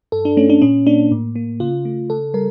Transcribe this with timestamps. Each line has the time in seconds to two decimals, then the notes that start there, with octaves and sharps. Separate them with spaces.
0.12 G2 A4
0.25 D4
0.37 A3 C#4
0.50 D4
0.62 A#2 C#4
0.86 A#3 D4
1.11 A2
1.36 A#3
1.60 C#3 F4
1.85 A3
2.10 C#3 A4
2.34 G3 A#4